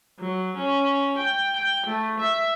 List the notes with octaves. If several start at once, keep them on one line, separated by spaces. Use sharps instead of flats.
F#3
C#4
G5
G5
A3
E5